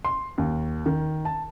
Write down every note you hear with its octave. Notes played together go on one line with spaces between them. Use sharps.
C6
D#2
D#3
A5